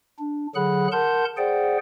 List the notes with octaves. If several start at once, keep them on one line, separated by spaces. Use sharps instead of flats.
D4
D3 F#3 G#4 F#5 B5 F#6
A#4 F#5 A5 C6 G6
G#4 C5 D5 F#5 G5